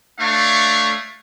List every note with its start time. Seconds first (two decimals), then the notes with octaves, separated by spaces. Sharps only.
0.19 A3 D4 C#5 E5 F5 C#6